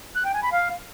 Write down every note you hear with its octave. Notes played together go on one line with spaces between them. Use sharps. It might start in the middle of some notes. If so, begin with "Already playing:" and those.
F#6
G5
G#5
B5
F5